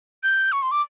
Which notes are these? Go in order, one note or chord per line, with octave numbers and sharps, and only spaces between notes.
G6
C#6
C6
D6